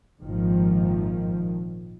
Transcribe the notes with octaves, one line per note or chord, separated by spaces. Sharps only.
G#1 A#2 D#3 F3